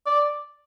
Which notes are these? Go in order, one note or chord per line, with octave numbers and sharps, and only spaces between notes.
D5